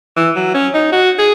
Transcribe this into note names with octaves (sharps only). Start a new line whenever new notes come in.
E3
F#3
C#4
D#4
F#4
G#4